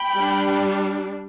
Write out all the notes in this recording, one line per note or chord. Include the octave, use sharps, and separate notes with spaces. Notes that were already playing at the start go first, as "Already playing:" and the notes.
Already playing: G5 B5
G3 D4